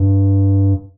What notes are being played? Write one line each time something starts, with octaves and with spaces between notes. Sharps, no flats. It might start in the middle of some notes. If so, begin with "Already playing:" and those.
Already playing: G2